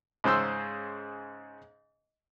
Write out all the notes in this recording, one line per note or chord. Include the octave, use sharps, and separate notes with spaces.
G#2 C#3 C5 C6 E6